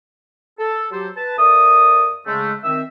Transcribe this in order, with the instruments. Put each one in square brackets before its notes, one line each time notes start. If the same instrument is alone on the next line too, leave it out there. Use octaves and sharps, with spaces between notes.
[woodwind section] A4
F#3 G4 A4 C5
B4 A5
F2 A#4 D5 E5 D#6
C#3 G#3 A3
D#3 C4 E5